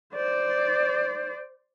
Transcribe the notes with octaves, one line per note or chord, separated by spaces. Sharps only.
C5 D5